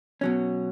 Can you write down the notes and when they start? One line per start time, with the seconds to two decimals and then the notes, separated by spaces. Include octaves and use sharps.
0.21 B2 F#3 C#4